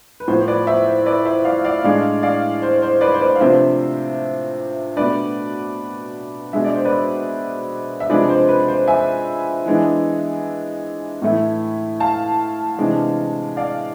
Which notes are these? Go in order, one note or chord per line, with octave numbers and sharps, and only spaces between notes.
B4
A2 F3 B3 C5
C5
B4 D5
C5 E5
C5
B4 D5
C5 E5
D5 F5
D5 F5
A2 G#3 D4 D5 F5
D5 F5
C5
C5
B4 D5
C5
B4 D5
F5
C3 F3 A3 D4 C5 E5
B2 A3 D4 B4 D5
B2 G#3 D4 E5
D5
C5
B4 D5
E5
C3 F3 G#3 D4 B4 D5
C5
B4
C5
E5 G#5
E3 G#3 B3 D4
A2 E3 A3 E4
F5 A5
C3 E3 G#3 D4
D5 F5